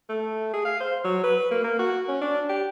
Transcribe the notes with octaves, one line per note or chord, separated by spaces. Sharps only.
A3
G#4
F5
C5
F#3
B4
A#3
A#3
F#4
C#4
D4
G4